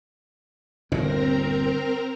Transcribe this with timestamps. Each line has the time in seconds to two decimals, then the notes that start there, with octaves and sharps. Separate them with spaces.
0.92 G1 D#2 A#2 C4 A#4 A#5